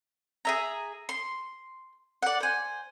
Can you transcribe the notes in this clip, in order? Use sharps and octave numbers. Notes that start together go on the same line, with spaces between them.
G#4 E5 A#5
C6
D5 F#5
C5 G#5